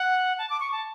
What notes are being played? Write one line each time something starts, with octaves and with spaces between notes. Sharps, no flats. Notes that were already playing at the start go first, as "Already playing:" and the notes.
Already playing: F#5
A5
D6
C#6
A5